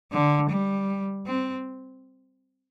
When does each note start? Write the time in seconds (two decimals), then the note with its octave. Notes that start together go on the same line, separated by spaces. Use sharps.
0.12 D3
0.50 G3
1.26 C4